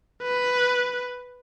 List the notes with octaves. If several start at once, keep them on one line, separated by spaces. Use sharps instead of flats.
B4